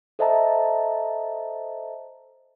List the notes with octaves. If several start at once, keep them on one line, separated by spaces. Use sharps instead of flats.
A4 C5 D#5 E5 A5 A#5